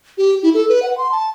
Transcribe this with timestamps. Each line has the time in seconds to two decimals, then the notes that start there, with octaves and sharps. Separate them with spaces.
0.18 G4
0.43 E4
0.54 A4
0.69 B4
0.83 F#5
0.98 C6
1.12 A5